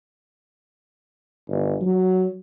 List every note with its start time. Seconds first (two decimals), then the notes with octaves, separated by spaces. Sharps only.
1.49 G1
1.82 F#3